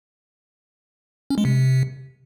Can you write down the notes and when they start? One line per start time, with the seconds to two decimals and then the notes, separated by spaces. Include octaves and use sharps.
1.30 C#4
1.38 G#3
1.45 C3